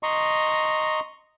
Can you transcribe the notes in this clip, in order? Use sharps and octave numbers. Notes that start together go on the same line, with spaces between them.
D#5 A#5 C6 C#6